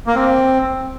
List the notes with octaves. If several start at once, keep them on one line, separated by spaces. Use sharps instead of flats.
A#3
C4